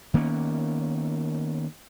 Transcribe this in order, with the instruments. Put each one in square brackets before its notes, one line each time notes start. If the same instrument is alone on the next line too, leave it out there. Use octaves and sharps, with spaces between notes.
[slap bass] D#3 A#3 B3 C#4